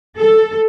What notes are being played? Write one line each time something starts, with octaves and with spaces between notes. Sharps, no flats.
A4